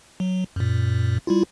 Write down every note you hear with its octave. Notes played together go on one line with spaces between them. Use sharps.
F#3
F#2 A#2
G3 E4 F4